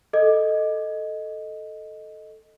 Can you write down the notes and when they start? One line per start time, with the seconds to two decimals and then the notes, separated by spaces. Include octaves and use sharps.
0.13 A4 D#5